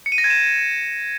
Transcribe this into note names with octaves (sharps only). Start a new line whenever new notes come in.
C#7
D#7
A#6
G#6
E7